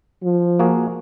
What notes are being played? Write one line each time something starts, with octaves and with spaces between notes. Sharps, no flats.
F3
A#3 F#4 G#4